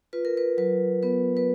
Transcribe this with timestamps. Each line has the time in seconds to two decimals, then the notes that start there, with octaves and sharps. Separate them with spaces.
0.13 F4 B4
0.25 A#4
0.37 B4
0.57 F#3 B4
1.03 B3 B4
1.37 B4